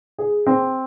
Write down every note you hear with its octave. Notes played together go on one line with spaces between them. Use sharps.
G#4
C4